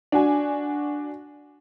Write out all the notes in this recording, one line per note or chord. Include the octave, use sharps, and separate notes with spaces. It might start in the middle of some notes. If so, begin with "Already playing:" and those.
D4 F#4 G#5